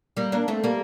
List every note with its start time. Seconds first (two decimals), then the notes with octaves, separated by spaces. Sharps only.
0.17 G3 A#3
0.32 A#3 D4
0.48 A3 C4
0.64 G3 A#3